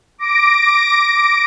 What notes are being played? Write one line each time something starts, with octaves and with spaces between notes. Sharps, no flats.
D6 A#6 D7